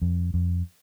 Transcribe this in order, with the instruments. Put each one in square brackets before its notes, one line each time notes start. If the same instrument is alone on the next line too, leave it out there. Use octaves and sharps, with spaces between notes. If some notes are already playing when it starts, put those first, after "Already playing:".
[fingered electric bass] F2
F2